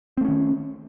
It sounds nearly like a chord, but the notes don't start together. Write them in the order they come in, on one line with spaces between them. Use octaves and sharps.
C4 A3 C#4 D#3